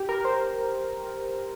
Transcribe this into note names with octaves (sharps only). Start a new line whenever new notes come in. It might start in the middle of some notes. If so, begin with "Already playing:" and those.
Already playing: G4
A#4
C5